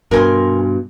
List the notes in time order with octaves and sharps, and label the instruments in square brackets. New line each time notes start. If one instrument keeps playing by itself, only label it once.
[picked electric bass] G2 B2 [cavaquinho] A#4 G#5 C6